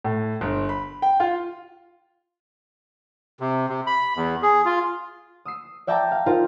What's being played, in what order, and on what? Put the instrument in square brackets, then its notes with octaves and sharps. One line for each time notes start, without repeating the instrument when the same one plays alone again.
[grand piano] A2
G1
B5
G5
F4
[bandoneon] C3
C3
B5
E2
G#4
F4
[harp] D#6 E6 C7
D5 E5 G5 A5 A#5 D6
F5
D#4 F4 A#4 C5